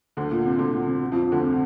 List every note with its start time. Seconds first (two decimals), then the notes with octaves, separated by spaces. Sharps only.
0.17 D2 D3
0.31 A#2
0.45 C3
0.58 D2 D3
0.73 A#2
0.87 C3
1.12 F2 F3
1.22 F2 F3
1.32 D2 D3
1.43 C3